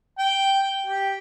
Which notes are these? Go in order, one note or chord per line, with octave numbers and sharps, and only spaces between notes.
G5
G4